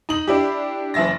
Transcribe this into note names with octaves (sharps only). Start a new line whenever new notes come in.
D#4 F#7
D4 E4 G4
F#1 E3 E5 A6 A#6